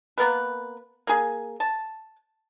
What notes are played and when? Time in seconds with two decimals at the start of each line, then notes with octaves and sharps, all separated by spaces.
0.18 A#3 B3 A#4 B4
1.07 A#3 G#4
1.60 A5